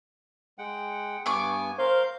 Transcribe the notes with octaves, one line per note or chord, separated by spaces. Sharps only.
G#3 F#5 G5
G2 B3 G#5 C#6 D6
A#4 C5 F5 G6